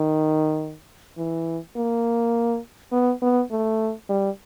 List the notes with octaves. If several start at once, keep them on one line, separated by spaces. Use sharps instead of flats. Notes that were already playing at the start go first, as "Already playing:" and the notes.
Already playing: D#3
E3
A#3
B3
B3
A3
G3